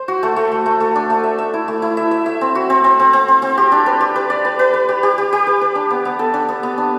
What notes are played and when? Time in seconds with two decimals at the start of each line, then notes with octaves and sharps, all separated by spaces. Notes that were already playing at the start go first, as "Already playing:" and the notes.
Already playing: C5
0.08 F#4
0.23 A3
0.36 A3
0.52 A3
0.66 A3
0.80 A3
0.96 D4
1.10 A3
1.24 E5
1.38 E5
1.54 E4
1.68 A3
1.82 E4
1.97 E5
2.11 E5
2.26 E5
2.41 C4
2.55 F#4
2.70 C4
2.84 C4
2.99 C4
3.13 C4
3.28 C4
3.42 C4
3.57 G4
3.72 D4
3.86 B4
4.01 G4
4.16 B4
4.30 D5
4.45 B4
4.59 B4
4.74 B4
4.89 G4
5.03 G4
5.18 G4
5.33 G4
5.47 B4
5.61 B4
5.75 D4
5.90 B3
6.05 B3
6.19 A4
6.34 D4
6.49 B3
6.63 B3
6.78 D4